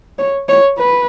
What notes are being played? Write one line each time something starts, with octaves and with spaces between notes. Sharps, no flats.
C#5
C#5
B4